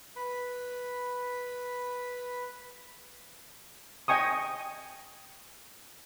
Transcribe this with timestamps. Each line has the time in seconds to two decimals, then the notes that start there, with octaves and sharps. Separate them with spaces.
0.16 B4 B5
4.08 D#5 G5 G#5 C#6 D#6